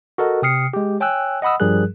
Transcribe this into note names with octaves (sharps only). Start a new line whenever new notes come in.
F#4 A4 A#4 D#5
C3 G5 D#6 F6 C7 C#7
G#3 G4
C#5 G5 G#5 E6 F#6
D#5 F#5 B5 D#6 E6
G2 F3 G3 G#4 A#4 F#6